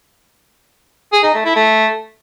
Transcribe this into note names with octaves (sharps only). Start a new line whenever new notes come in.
G#4
D#4
A3
E4
A3